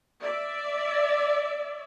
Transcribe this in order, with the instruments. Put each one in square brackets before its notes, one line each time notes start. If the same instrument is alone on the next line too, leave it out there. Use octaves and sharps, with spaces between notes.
[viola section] D5 E5